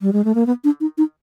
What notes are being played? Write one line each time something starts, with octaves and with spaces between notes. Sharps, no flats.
G3
G#3
A3
A#3
B3
D4
D#4
D#4